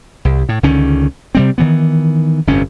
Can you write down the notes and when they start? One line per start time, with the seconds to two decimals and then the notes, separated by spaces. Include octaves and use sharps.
0.25 C2
0.49 A2
0.63 C#2 D3 D#3 C#4
1.35 C3 G3 C4
1.58 D#3 E3 B3
2.47 G1 F2 C3 C#4